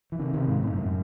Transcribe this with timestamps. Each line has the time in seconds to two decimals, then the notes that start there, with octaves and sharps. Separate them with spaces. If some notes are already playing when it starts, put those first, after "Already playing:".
0.12 E3
0.19 C3 D#3
0.34 C3 D#3
0.48 G#2 C3
0.62 F#2 A2
0.78 F#2